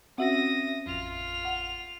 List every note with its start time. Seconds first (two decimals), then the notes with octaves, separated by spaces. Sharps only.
0.18 C4 C#4 F#4 E5 F#5 D#6 A#6
0.86 A1 F2 F4 F7
1.45 F#5